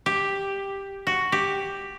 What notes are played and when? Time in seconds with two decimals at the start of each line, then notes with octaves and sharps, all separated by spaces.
0.06 G4
1.07 F#4
1.32 G4